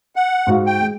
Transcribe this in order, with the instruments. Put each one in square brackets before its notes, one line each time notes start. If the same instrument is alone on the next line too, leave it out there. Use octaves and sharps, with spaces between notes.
[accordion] F#5
[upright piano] G#2 F#4 F5
[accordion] G5
[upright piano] G#3